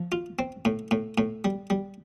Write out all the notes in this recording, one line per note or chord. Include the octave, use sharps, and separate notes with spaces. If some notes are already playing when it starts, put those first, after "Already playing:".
Already playing: F3
F4
C4
A2
A2
A2
G3
G3